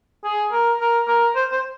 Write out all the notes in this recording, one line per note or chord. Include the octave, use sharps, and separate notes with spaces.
G#4
A#4
A#4
A#4
C5
C5